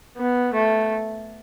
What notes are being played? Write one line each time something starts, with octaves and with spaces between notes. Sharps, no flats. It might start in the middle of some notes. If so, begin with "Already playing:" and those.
B3
A3